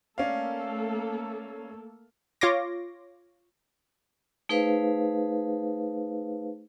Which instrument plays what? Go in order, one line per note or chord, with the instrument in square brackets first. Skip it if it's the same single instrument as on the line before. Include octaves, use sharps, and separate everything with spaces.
[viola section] A3 A#3 A4 [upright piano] C#4 D5 F5
[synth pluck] F4 C#5 C6 D6 A#6
[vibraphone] A3 D#4 G#4 B4 C5 F5